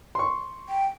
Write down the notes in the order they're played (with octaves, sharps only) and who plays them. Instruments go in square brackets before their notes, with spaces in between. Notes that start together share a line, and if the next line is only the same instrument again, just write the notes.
[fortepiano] C6 C#6
[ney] G5